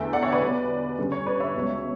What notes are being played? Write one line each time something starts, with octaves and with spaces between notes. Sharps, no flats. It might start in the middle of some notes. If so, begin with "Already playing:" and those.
Already playing: E2 D3 A3 E5 G5
D5 F#5
C#5 E5
B4 D5
B2 G3 B3
G2 D3 G3 C#4
C#5
B4 D5
C#5 E5
C#2 B2 F#3 B3